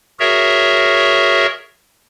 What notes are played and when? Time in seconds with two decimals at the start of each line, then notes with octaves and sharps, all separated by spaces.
0.20 F#4 G#4 A#4 C#5 E5